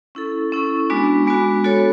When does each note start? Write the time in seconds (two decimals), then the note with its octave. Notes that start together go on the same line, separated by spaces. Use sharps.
0.15 C#4 E4 A4
0.52 C#4 E4 A4
0.90 G#3 B3 D4 F#4
1.27 G#3 B3 D4 F#4
1.64 B3 F#4 A4 C#5